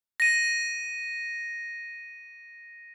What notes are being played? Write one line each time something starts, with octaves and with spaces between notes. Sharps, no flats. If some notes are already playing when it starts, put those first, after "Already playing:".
A#6 D#7